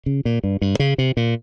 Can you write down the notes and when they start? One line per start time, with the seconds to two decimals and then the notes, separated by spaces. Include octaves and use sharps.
0.06 C#3
0.25 A#2
0.44 G2
0.62 G2
0.79 C#3
0.98 C3
1.17 A#2